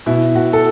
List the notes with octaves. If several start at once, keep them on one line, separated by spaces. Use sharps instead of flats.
B2 E4
B2 F#4
A4